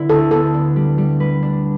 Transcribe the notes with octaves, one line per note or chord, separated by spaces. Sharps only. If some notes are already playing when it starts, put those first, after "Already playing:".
Already playing: D3 B3 E4
D2 A4
B3 A4
D4
G3
G3
B4
D4